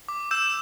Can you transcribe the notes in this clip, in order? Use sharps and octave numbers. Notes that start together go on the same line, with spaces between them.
D6
E6 G6 E7